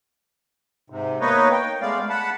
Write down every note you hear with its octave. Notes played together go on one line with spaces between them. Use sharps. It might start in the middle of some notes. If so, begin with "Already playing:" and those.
G#2 C3
A#3 B3 D#4 B4 C#5 D#5
G5
G#3 A3 B3 D5 F5
F#5 A5 B5